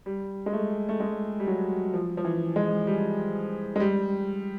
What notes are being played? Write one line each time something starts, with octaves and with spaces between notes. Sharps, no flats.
G3
G#3
A3
A3
G#3
G3
F#3
F3
F3
E3
G#3
G3
G#3
G3